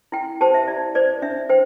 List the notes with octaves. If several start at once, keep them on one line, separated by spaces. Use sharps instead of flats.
E4 G5
G4 C5 A5
E5
E4 D5
C5 D5
D4 E5
C5 G5